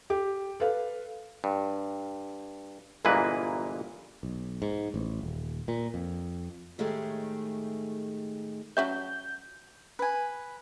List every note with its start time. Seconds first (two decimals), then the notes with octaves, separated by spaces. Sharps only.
0.10 G4
0.60 A4 B4 F5
1.44 G2
3.05 G1 A#2 E3 G#3 A#3 B4
4.23 B1
4.62 G#2
4.94 A1
5.21 D#1
5.68 A#2
5.94 F2
6.78 A2 D#3 G#3 A3 G4 G#4
8.77 F#3 C#4 E5 G6
9.99 B4 G#5